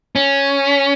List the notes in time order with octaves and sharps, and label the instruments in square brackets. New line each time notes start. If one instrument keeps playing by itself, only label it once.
[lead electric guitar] C#4